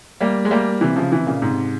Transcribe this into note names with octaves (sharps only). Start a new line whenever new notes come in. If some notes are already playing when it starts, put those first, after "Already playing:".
G3 A#3
G#3
G3 A#3
C3 E3
C#3 F3
C3 E3
A#2 C#3
G#2 C3